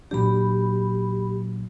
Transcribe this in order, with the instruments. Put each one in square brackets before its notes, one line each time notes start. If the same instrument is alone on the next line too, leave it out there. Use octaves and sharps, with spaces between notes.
[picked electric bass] A#2 F#3 D4 [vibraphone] G4 B5